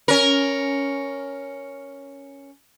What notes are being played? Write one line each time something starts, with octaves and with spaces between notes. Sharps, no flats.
C#4 A#4